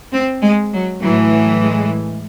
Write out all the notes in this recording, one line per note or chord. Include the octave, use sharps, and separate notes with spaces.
C4
G#3
F#3
A2 E3 F#3
F#3
G#3